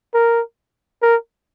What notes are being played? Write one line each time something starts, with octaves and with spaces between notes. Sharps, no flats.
A#4
A#4